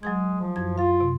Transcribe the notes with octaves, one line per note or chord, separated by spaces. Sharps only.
F#3 G#3 G#4 G#6
F3
F#2 E4 G#6
F4 F5 A6
C3